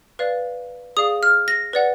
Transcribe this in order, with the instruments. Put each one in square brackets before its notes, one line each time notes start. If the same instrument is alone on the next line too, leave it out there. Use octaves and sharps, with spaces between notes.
[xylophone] B4 D5 F5
G#4 D5 F5 D#6
F6
A#6
B4 D5 F#5